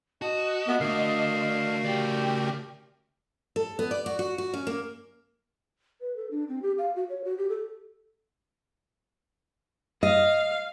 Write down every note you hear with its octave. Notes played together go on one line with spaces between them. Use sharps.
F#4 D#5 A5
B3 A#4 E5
D3 A3 F#4 A#4 F5
C#3 G4 D5
A4
B3
D5
F#4
F#4
F#4
C#4
A#3
B4
A4
D4
C4
G4
F5
F#4
C#5
F#4
G4
A4
D#5 F5